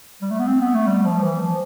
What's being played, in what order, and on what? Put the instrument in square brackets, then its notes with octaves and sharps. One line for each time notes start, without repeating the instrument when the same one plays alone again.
[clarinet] G3
A3
B3
C4
B3
A3
G3
F3
E3
F3